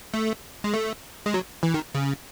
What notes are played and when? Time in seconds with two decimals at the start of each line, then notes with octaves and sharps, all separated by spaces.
0.14 A3
0.64 G#3
0.74 A3
1.26 G#3
1.34 F#3
1.63 E3
1.74 D#3
1.95 C#3